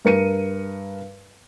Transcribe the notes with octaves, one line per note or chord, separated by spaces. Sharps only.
G2 A#4 C#7 D#7